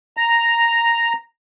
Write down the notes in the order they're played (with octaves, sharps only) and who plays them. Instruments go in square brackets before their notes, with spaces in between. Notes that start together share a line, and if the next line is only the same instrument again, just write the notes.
[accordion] A#5